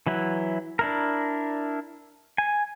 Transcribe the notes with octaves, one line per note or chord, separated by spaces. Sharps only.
E3 F#3 E4
D4 E4 A#4
G#5